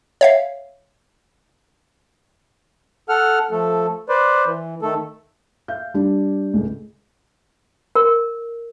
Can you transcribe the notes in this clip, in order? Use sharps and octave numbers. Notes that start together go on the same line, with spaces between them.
C#5 E5 F5
A4 F#5 F6
F3 A3 A4
B4 C5 D5
E3
D#3 A3 A4
E5 F5 G6
G3 D4
C#2 A2
A#4